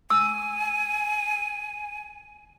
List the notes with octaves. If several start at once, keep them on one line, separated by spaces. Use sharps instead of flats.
G#5 E6